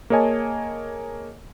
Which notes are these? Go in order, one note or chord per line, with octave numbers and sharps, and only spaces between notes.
A#3 G#4 C#5 D#5 G#5 A5